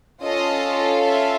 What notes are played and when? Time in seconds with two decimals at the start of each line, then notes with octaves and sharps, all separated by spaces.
0.23 C#4 F4 A4 D#5
1.06 E5